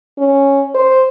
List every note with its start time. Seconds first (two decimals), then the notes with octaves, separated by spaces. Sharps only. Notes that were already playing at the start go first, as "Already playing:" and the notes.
0.18 C#4
0.75 C5